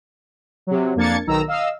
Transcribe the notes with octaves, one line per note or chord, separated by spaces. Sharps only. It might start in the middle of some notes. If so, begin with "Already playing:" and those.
C3 F#3
F2 A#3 D4 G#6 A6 C#7
B1 D#3 A#5 E6
D#5 F5 E6